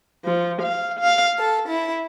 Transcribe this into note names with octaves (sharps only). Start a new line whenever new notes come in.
F3
F5
F5
A4
E4